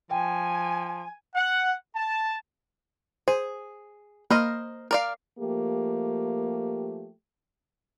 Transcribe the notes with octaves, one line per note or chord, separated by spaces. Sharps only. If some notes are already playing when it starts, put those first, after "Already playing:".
F3 G5 G#5
F#5
A5
G#4 C5
A#3 A#4 C5 D#5 B5 F6
A#4 D5 F5
F3 A3 A#3 G4